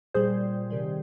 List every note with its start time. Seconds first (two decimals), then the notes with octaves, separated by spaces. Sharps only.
0.14 A#2 G3 G#4 C5
0.70 C3 D#3 G3